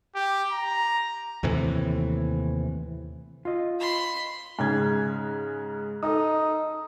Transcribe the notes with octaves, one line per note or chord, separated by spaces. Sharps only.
G4
A#5
D#2 A2 C3 E3
F4 D#5
B5 C6
G#2 C#3 G#6
D#4 A4 D#5 D#6